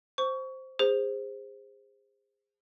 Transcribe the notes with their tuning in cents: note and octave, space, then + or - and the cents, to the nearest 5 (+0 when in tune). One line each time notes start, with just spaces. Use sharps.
C5 +0 C#6 +25
G#4 -30 C5 +0